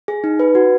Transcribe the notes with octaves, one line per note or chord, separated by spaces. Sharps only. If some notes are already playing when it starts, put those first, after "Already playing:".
G#4
D#4
B4
F#4